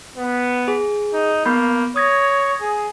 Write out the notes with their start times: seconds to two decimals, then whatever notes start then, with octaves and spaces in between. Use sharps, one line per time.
0.16 B3
0.68 G#4
1.13 D#4
1.45 A#3 B3 B5 G6
1.96 C#5 D#6 G#6 A#6
2.61 G#4